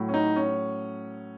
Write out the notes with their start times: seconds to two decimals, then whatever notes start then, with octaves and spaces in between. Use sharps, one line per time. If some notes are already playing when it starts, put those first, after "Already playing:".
Already playing: A2 F#3
0.09 C#4
0.14 D#4
0.36 C#4